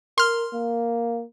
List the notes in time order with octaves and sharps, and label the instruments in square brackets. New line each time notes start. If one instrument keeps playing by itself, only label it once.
[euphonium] A#4 [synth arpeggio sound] C6 F6
[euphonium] A#3